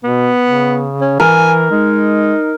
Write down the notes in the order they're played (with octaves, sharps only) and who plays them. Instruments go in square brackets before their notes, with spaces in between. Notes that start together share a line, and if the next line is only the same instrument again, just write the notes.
[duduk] B2 [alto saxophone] B3
[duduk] C#3
[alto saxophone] C#4
[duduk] E3 [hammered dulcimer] A#4 [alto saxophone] G#5
[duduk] G#3 [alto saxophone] D#4